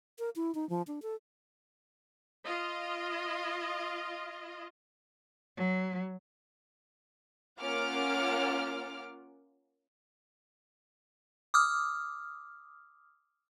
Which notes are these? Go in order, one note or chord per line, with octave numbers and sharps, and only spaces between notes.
A#4
E4
D#4
F3
D4
A4
F4 D#5
F#3
A#3 C#4 F4 F#5 D6 F6
D6 D#6 F6